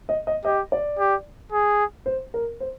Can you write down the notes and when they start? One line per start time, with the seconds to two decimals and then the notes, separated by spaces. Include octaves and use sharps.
0.09 D#5
0.27 D#5
0.45 G4 D#5
0.72 D5
0.99 G4
1.52 G#4
2.06 C5
2.34 A#4
2.60 C5